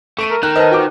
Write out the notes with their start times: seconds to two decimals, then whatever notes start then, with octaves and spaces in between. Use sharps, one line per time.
0.19 A3 C#6 D7 D#7
0.30 A#4
0.43 D#3 A#4 F#6
0.56 B4 C5 D#5 A5
0.71 F#4 G5 D6